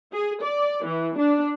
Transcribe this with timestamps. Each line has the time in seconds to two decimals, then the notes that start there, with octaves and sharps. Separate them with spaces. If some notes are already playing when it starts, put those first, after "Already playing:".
0.13 G#4
0.42 D5
0.84 E3
1.18 D4